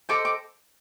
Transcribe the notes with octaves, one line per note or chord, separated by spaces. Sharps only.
A4 C5 D#5 D6
D6